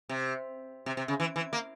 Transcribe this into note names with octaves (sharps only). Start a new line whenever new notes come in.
C3
C3
C3
C#3
E3
E3
A#3